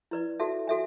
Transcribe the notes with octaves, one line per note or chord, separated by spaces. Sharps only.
E4 B4 D5
F#4 A4 E5 A5
F#4 A4 E5 G#5